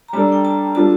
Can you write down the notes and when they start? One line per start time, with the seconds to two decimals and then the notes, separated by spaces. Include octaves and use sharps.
0.08 A#5
0.13 G3 D4 A4 D5 A5
0.32 G5
0.45 A5
0.75 G3 D4 F4 A4 A5